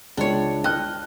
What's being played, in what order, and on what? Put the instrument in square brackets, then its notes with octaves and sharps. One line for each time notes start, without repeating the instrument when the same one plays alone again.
[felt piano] C#2 [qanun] D4 C#5
[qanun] D#5 [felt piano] G5 F6 F#6